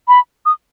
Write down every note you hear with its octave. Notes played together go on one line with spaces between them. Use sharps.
B5
D#6